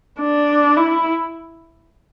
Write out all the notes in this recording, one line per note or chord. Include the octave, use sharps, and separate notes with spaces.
D4
E4